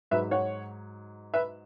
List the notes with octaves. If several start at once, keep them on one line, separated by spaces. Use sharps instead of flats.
G#2 F#3 B4 E5
C#5 F#5
B4 E5